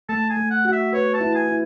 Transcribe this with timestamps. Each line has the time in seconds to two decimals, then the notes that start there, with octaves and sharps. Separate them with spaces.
0.09 A3 A5
0.30 G#5
0.37 A3
0.50 F#5
0.65 F#4 F#5
0.72 E5
0.93 B4 C#5
1.14 A5
1.20 E4
1.35 G#5
1.48 E4